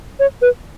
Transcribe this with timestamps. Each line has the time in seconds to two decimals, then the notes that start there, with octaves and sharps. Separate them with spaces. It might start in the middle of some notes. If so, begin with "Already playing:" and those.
0.20 C#5
0.42 B4